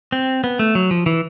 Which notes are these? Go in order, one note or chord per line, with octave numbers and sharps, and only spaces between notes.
C4
B3
A3
F#3
F3
E3